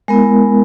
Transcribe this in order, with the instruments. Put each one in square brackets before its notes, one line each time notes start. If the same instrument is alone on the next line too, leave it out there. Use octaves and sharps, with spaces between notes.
[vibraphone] G#3 B3 E4 A#4